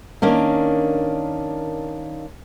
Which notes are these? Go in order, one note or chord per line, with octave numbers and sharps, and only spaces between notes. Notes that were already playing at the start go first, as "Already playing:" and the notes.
D#3 A#3 C#4 D4